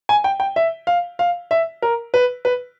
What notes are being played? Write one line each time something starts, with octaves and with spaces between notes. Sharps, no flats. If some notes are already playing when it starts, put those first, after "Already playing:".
G#5
G5
G5
E5
F5
F5
E5
A#4
B4
B4